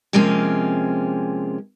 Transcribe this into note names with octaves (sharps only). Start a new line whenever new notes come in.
C3 F3 G#3 A#3 C4 C#4